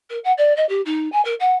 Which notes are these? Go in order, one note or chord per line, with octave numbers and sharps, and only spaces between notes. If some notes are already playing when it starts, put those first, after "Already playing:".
A#4
F#5
D5
D#5
G4
D#4
G#5
A#4
F#5